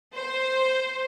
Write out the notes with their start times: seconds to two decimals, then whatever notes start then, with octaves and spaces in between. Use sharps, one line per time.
0.13 C5